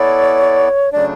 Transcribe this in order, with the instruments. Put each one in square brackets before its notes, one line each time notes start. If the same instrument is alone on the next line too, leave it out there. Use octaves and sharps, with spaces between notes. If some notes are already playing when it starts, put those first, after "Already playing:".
Already playing: [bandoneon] B3 E4 A4 D5 [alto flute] C#5
[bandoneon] C#3 F#3 A3 D4 [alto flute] D5